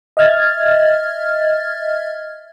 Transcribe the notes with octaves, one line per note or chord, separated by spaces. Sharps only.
D#5 E5 F6 G#6 A6